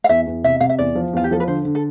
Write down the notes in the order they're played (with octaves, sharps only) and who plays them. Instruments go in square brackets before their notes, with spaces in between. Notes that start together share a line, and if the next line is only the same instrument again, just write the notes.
[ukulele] F5
[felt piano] E2 [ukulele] E5
[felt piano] E2
[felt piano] C3 [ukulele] E5
[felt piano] C3 [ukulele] F5
[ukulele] E5
[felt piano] E2 [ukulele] D5
[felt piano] F3
[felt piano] E2 [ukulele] F4
[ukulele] G4
[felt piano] F3 [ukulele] A4
[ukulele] B4
[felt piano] D3 [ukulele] C5
[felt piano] D3
[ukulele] A4